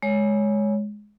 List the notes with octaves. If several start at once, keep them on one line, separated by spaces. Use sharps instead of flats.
G#3 C#5